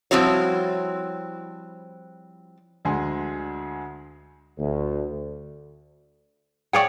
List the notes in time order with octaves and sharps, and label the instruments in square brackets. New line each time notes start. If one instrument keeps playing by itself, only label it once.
[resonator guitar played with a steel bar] F3 G3 C4 E4 F#4 C#5
[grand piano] D2 D3 G#3 G#4 C6
[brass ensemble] D2
[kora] G#4 C#5 D5 [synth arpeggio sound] F5 G5 C#6